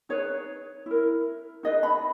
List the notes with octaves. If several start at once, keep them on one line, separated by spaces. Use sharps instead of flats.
D#4 G#4 B4 C#5
E4 A#4
D#4 G#4 B4 D#5
B5